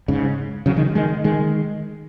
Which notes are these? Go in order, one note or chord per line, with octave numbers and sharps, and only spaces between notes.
G#2 C#3
C#3 F#3
D#3 G#3
D#3 G#3
D#3 G#3